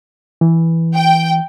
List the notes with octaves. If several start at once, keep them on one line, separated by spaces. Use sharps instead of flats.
E3
G5